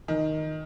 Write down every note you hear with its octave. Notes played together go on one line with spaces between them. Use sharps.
D#3